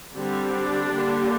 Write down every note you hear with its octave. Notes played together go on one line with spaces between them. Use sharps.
D3 G3 C4
D4
D3 G3 A#3